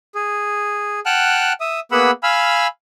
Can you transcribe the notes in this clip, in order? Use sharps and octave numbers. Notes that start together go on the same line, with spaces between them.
G#4
F#5 G5 A5 F6 F#6
E5 D#6
A#3 B3 G#4 F#5 B5 E6
F5 G#5 B5 E6 F6